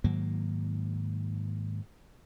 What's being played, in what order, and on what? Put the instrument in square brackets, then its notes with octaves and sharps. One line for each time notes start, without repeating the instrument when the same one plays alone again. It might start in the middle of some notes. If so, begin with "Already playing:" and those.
[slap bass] G#2 D#3 F#3 A#3